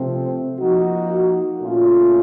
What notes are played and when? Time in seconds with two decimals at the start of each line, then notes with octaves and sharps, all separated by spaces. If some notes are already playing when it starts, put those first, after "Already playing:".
Already playing: C3 F3 A3 C4
0.60 F3 A#3 D#4 F#4
1.61 A#2 A3 C#4 F4